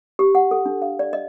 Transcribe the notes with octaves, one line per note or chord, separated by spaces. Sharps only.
G4
F#5
A4
D4
F5
D5
D#5